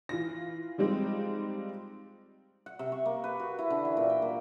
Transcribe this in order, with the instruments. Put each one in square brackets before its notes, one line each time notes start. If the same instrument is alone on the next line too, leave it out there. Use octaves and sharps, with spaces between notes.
[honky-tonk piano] E3 F4 A#6
F3 G3 G#3 C4 D#4
[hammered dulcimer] F#5
C3
C#6
A#3
B4
F#4
E4
D3
E3
A#2
G5
A#3